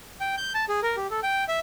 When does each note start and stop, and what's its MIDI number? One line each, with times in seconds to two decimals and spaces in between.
0.20 0.35 79
0.37 0.53 91
0.54 0.65 81
0.69 0.80 68
0.83 0.96 70
0.97 1.07 67
1.10 1.20 69
1.23 1.44 79
1.48 1.60 76